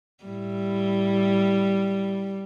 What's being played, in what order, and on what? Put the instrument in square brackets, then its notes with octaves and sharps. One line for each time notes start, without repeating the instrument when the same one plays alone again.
[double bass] A2 E4 [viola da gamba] G3